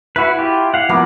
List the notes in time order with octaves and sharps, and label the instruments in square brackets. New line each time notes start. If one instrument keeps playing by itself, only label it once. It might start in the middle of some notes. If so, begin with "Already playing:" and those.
[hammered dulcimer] E4 G#5 [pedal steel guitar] F#4 B4
[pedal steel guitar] F4 G4
F5 F#5
[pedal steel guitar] F3 D6 [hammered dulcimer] F#3 A#3 B3